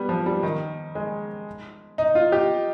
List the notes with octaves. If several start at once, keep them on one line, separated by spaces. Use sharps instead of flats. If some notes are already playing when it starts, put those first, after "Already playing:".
Already playing: G3 B3
F3
G3
D#3
G#3
D#4
F4
G4